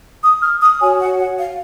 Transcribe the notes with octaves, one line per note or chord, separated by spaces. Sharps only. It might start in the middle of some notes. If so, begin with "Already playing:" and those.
D#6
F6
D#6
F#4 C#5 G#5
F#5
F#5
F5